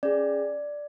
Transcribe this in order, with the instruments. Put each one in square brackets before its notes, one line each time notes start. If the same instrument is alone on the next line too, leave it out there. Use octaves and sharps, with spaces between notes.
[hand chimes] C#4 G#4 D5